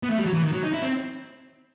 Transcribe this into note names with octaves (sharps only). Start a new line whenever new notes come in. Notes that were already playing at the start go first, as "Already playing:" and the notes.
B3
A3
G3
F#3
E3
D#3
F#3
D#4
E4
C4